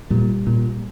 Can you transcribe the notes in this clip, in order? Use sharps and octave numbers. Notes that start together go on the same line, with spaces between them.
A#2 G3
A#2